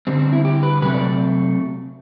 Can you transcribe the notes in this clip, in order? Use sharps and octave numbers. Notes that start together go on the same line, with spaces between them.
D3 G3 C4
C4
E4
G4
B4
C3 F#3 A3 C4 B4
D5